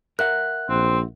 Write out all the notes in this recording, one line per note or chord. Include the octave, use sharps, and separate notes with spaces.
A#4 E5 F#5 F#6
A#1 C4